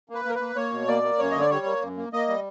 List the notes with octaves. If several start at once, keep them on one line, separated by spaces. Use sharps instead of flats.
A#3
B4
A#3 A#4
B4
A#3
A#3 C#5
B2
A#3 D5
A#3
F#2 C#5
D3 D#5
D5
G3 C#5
A#3
F#2
A#3
A#3 D#5
G3